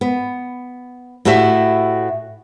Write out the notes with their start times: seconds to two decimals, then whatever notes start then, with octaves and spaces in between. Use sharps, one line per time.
0.01 B3
1.25 A2 E4 F#4 G4 E5